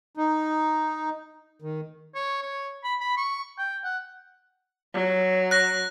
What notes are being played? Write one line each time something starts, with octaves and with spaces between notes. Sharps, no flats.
D#4
D#3
C#5
C#5
B5
B5
C#6
G5
F#5
F#3
F#6 A#6